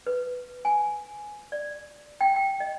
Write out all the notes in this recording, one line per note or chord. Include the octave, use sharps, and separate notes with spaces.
B4
G#5
D5
G5
G5
D#5